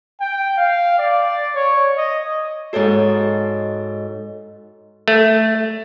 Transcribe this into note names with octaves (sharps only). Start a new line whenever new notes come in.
G5
F5
D5
C#5
D#5
G#2 F#4 A4 C#5 D#5
A3